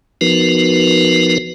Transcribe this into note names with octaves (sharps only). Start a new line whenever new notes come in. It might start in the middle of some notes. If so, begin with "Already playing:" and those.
F3 B3 D#4 F#4 A#4 B4